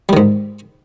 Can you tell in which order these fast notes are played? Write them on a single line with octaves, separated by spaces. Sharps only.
G3 D#3 G#2